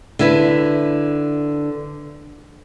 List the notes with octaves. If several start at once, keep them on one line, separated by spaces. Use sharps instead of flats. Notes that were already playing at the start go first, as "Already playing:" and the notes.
D3 E4 B4